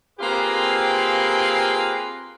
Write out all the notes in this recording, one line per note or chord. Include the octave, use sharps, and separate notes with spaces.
A#3 C4 F4 G4 G#4 B4